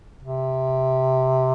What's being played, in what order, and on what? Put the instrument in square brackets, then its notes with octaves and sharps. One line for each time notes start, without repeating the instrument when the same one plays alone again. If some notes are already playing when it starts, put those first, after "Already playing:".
[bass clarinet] C3